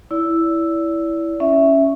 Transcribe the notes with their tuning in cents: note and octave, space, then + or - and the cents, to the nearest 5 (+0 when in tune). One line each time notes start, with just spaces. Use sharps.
E4 +0 D5 -35
C#4 +0 E5 +0